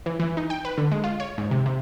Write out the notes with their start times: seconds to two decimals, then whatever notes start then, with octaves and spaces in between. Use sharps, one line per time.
0.06 E3
0.19 E3
0.37 D#4
0.50 G5
0.65 B4
0.78 D3
0.92 G#3
1.04 F4
1.20 C#5
1.38 G#2
1.51 C3
1.66 C3